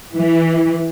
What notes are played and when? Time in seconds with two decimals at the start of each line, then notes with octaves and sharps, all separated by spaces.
0.14 E3